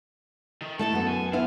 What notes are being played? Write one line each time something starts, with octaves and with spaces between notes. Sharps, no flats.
D#3
A3 E4 A4 A5
F#2 B3
G#5
B3 E4 F4 F5